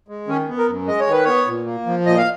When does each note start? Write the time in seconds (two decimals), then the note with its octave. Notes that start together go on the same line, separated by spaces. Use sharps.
0.08 G#3
0.28 D#3 C#4
0.48 B3
0.58 A#4
0.68 F#2
0.87 G#3 D#5
1.00 C#5
1.07 D#3
1.12 B4
1.24 B3 C#5
1.47 A#2
1.66 A#3
1.86 F3
2.06 A#2 D#5
2.18 F5